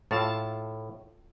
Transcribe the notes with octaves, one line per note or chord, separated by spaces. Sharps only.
A2 F4 A4 A5